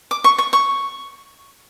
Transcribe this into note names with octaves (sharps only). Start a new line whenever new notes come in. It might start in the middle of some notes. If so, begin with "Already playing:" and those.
D6
C#6
C#6
C#6